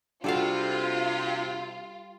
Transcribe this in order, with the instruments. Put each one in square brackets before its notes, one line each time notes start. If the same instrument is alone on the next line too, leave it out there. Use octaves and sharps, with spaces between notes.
[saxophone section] C3 [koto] G3 A4 F5 [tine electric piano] D4 F#4 F#5 [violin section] F4